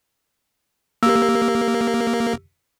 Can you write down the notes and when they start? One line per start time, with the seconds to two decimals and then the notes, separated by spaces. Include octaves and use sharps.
1.03 A#3 G4 E6